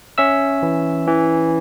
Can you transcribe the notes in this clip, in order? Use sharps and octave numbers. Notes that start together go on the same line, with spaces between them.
C#4 E5 E6
E3
E3